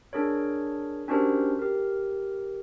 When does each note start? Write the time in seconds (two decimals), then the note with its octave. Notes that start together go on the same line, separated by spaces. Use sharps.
0.13 D4 G#4 A#4 C#5
1.08 C#4 D4 F#4 G4 A#4 C5
1.59 G4 A#4